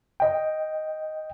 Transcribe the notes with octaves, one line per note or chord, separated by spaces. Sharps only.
D#5 G5